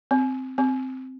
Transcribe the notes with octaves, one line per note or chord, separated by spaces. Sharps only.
C4
C4